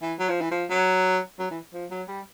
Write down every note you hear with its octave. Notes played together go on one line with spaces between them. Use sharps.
E3
F#3
F3
E3
F3
F#3
F#3
E3
F3
F#3
G3